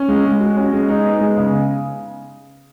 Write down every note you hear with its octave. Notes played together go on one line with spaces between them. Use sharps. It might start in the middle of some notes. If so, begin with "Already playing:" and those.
Already playing: C#4
G#3
G#3
F#4
C#4
G#3
D#4
B3
G#3
C#3